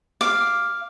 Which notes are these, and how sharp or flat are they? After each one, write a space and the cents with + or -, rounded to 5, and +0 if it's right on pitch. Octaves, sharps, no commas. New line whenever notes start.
F5 +0 D6 +0